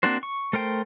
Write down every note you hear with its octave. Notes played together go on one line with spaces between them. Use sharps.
A#3 C4 D4 F#4 C5
C#6
A3 A#4 C5 G5